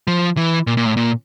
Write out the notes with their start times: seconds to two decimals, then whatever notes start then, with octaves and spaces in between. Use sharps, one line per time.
0.08 F3
0.37 E3
0.67 A#2
0.77 A#2
0.86 A2
0.97 A#2